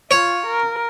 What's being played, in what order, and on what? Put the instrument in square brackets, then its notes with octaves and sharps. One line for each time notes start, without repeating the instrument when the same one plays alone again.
[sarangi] F4 [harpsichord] C#5
[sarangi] A#4